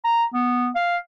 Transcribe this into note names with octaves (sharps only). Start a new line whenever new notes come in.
A#5
B3
F5